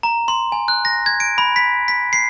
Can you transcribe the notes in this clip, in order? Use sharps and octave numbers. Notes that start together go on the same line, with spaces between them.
A#5
C6
G#5
F#6
A#6
G#6
D7
B5
B6
B6
C7